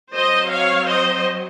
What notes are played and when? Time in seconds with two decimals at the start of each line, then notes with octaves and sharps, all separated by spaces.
0.14 F#3 C4 C5 D#5
0.51 C#5 F5
0.88 C5 D#5